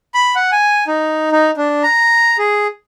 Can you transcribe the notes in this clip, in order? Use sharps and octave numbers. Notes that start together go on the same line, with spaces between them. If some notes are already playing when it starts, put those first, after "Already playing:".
B5
F#5
G#5
D#4
D#4
D4
A#5
G#4